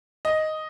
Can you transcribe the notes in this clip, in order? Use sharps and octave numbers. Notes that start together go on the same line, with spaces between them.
D#5